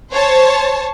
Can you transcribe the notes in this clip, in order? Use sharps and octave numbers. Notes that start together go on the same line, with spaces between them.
C5 C#5 A5